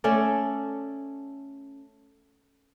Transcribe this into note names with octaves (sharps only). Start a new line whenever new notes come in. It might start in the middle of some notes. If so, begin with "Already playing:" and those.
A3 C#4 A4 D5